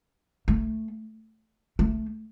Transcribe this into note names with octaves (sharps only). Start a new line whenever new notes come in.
A3
A3